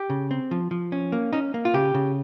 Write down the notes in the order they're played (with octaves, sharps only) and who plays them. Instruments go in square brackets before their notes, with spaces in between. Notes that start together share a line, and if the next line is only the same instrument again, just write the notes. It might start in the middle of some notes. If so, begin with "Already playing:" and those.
Already playing: [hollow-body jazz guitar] G4
C#3
C4
F3
F3
C#4
A#3
C#4 D#4
A#3
F4
C#3 G4
C#3